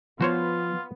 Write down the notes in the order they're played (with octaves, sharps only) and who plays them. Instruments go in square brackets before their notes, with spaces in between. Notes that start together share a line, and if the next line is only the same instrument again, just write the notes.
[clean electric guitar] F3 [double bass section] B3 [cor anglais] F4 [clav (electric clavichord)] F#4 C5 C#5